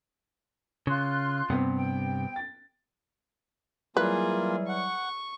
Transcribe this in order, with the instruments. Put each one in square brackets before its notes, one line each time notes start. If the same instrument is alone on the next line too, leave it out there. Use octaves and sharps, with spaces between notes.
[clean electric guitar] C#3 [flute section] F4 C6 F#6
[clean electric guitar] G2 C3 [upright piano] B3 C4
[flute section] G5
[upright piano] A6
[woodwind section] E3 F#3 G3 [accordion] A#3 F4 [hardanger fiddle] G#4 [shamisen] B4
[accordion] F#5 [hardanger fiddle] C#6